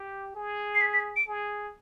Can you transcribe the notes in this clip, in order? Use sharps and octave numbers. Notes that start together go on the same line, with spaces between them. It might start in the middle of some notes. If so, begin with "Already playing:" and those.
Already playing: G4
G#4
C7
B6
B6
D7
G#4